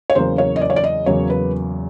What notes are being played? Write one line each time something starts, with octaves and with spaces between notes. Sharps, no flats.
C#5
E2 C#3 F#3 A#3 C5
C#5
D#5
D5
C#5
D5
D#5
E2 C#3 F#3 A#3 C#5
B4